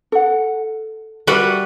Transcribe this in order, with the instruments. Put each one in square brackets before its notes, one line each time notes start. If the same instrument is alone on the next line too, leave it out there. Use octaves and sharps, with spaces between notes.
[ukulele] A4 F#5
[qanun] G3 B4 F#5 [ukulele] F#4 A#4 E5